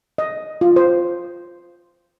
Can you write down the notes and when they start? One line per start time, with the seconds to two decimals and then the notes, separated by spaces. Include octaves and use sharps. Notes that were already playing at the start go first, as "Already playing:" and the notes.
0.18 D#5
0.61 F4
0.76 C5